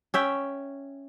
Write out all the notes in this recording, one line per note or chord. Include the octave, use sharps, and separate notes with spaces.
C#4 E5 G5